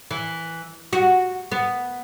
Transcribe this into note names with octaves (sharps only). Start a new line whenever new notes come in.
E3
F#4
B3